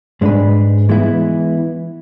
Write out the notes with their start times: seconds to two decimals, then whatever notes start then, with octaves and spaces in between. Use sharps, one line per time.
0.21 G#2 G#3 D4 G#4 B4
0.89 E3 G#3 B3 E4